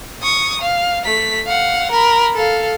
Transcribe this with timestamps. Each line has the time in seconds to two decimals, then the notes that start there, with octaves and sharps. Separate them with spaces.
0.23 C#6 D#6
0.62 F5
1.05 A3 B6
1.47 F5 F#5
1.92 A#4 B5
2.35 A4 F5